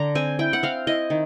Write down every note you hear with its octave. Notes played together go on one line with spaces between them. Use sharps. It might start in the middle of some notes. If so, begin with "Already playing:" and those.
Already playing: D3 D4 A#5
C4 G#5
E4 G5
F#5
C4 F5
E4 D#5
D#3